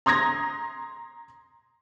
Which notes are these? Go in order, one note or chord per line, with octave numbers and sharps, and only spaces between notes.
A#5 C6 D#6 G#6 A#6